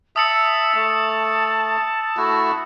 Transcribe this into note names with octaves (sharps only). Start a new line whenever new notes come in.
E5 A5 D#6 E6 C#7
A3
A3 E4 F#4